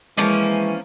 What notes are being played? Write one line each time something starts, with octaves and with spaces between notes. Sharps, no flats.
E3 F3 G#3 A#3 C#4